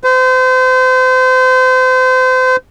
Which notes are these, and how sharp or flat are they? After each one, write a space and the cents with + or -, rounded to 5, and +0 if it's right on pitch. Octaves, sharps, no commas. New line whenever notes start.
C5 -35